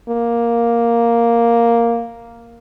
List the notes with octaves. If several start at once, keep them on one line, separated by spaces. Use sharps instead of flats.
A#3